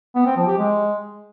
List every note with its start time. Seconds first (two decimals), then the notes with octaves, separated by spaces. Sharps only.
0.15 B3
0.26 C4
0.36 F3
0.47 G4
0.58 G#3